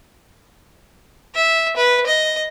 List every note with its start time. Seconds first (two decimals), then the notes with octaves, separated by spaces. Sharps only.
1.35 E5
1.77 B4
2.06 D#5